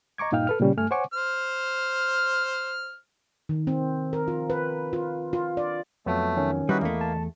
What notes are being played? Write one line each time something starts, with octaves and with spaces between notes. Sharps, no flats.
D#5 A#5 C#6 D6 G#6
G2 A#2 D#4 F5 G5 F6
A4 B4 F6
A#2 C#3 G3 C#4
G2 A3 G#5 F6
C5 C#5 F#5 G#5 C#6 D6
C5 F6
D#3
C4
A#4
F4
B4
F4
F4
D5
F2 F#3 A3 B3
D#3 C#4
G3 E4 F#4 A#4 B4 D#5
E2 A3 A#3
A5